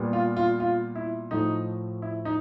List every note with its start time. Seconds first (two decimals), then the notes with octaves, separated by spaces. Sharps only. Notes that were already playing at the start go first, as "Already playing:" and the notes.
Already playing: A#2 G3 B3
0.13 F4
0.37 F4
0.60 F4
0.95 E4
1.31 A2 F3 A3 D#4
2.02 E4
2.25 D#4